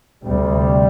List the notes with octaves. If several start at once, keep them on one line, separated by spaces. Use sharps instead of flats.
D2 C3 G3